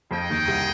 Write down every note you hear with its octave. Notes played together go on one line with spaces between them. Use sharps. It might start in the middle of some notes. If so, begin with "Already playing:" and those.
F2 F3 D#4 G#4 D#5 G5
D#2 D#3
C2 C3